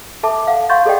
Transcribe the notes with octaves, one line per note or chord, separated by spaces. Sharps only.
A4 E5 A5 D6
F5 F#5
F5 F#5 C6 C#6 G6 A6
G#4 A4 D5 D#5 F#5 G5